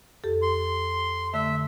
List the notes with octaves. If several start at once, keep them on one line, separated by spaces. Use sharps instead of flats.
F2 G4 A4
C6
D3 A3 E5